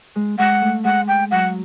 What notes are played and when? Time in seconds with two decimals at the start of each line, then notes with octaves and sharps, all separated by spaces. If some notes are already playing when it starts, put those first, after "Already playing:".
0.15 G#3
0.39 G#3 F#5
0.62 A3
0.84 G#3 F#5
1.08 G5
1.31 F#3 F#5